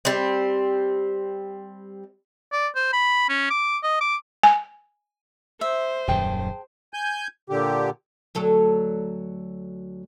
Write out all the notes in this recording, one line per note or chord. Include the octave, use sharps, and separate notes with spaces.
G3 C4
D5
C5
B5
C#4
D6
D#5
D6
G#5
C5 E5
D#1 F#2 D#3 G#4 G5 A5
G#5 G6
A#2 D3 G4
D2 F#3 A4